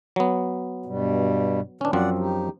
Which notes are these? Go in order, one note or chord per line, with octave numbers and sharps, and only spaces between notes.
F#3 B3
G2 B2 G3
E2 B2 E3 C#4 D4
F#2 F3 C4 D5 F#5
D#4 G4